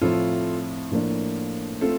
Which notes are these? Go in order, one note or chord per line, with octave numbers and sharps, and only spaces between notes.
A2 F3 C4 E4 F4 A4
A2 F3 A#3 D4
A3 C4 F4 A4